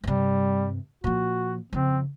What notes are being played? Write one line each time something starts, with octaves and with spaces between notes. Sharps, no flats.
G2 C3 G3
A#2 F3 F#4
F2 C#3 C4